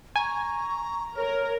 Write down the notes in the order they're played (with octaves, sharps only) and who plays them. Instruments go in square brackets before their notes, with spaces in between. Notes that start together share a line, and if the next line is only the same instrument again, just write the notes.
[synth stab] G#5 [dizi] A#5 [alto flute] C#6
[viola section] A#4 [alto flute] C#5